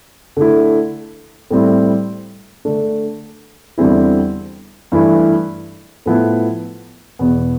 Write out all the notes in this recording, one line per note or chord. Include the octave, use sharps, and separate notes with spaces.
D3 A3 E4
A2 G3 C4 E4
D3 A3 D4
E2 D3 G3 C4 E4
G2 E3 A3 E4
A2 F3 B3 E4
E2 B2 B3